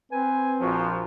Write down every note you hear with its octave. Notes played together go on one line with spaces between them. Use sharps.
C4 B4 G#5
A#1 F3 F#4 C5